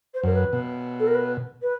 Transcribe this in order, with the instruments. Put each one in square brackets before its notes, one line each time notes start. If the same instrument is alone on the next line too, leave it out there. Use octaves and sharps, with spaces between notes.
[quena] C5
[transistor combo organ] F#2 [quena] A#4
[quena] B4
[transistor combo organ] B2
[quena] A4
A#4
B4
B4